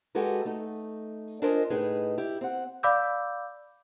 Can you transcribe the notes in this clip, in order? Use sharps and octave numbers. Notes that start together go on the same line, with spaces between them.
G#3 F#4 G4 A4 B4
A3 D#4
D4 F4 A#4 C5 D#5 G#5
A2 D#4 G#4 B4 D#5
E4 G4
C4 F#5
D5 F5 B5 D6 E6 G6